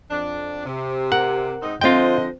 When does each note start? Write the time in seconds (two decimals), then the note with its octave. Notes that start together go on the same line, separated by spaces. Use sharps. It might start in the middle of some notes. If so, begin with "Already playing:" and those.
0.11 F2 D4
0.65 C3
1.12 A#4 F#5
1.62 G#2 C4 D#4
1.81 D3 F3 C4 F4 C5 D#5 G5